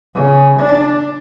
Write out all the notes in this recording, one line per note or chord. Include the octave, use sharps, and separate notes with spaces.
C#3
D4